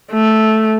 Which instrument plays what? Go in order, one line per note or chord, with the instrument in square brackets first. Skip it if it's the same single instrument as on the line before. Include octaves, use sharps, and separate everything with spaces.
[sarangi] A3